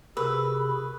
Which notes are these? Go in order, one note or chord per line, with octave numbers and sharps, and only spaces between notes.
C3 F#4 G#4 A#4 B4 B5 E6